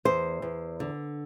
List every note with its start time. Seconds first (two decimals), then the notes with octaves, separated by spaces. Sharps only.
0.05 E2 C5
0.42 E2
0.80 D3